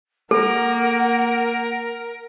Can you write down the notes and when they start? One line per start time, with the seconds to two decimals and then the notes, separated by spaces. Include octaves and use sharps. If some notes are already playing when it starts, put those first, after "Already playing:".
0.31 A#3 A4 A#4 F#5